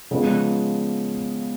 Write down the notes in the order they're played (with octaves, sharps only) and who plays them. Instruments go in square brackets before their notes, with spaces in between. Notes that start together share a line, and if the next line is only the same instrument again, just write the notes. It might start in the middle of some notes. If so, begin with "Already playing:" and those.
[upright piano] C#3 F3 G#3 B3